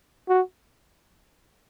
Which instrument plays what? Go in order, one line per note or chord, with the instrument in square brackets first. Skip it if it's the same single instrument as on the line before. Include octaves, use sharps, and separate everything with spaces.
[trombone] F#4